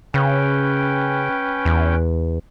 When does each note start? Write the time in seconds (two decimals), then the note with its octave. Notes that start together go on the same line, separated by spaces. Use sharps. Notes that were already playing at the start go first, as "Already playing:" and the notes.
0.14 C#3 C#4 B4 G5
1.65 E2